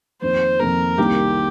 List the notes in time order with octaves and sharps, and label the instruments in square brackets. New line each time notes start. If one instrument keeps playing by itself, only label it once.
[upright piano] F2 D#3 A#3 [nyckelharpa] C5
[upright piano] F2 D#3 A#3 [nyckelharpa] A#4
[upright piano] C2 C3 D#3 A#3 [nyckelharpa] G4